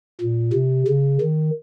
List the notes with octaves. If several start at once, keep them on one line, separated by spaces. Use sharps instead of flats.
A#2
C3
C#3
D#3